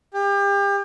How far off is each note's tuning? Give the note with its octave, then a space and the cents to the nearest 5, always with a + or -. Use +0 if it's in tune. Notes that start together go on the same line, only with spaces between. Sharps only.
G4 +35